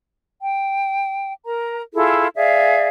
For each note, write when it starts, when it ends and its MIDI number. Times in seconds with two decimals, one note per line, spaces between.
0.40 1.32 79
1.45 1.82 70
1.45 1.82 82
1.94 2.27 64
1.94 2.27 65
1.94 2.27 68
1.94 2.27 69
2.36 2.88 68
2.36 2.88 74
2.36 2.88 76
2.36 2.88 77